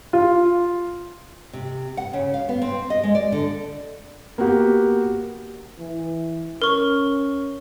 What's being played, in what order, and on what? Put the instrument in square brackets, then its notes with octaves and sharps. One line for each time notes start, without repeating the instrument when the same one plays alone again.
[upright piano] F4
[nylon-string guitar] C3
F#5
C#3
F5
B3
C4
D#5
G#3
D5
D3
[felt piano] A#3 B3 F#4 G4
[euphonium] E3
[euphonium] C#4 [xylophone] A#4 C#6